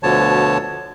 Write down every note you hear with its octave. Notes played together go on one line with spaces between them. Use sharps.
D2 B2 D3 F3 C#5 A5